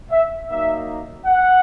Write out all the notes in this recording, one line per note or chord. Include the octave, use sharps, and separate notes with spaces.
E5
F#3 A#3 D#4 E5
F#5